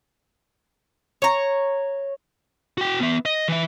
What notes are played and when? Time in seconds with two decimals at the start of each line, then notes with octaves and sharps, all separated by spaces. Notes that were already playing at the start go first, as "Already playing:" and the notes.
1.22 C#5 A#5
2.78 F#4 G5
3.00 B3 E5
3.25 D#5
3.48 E3 E5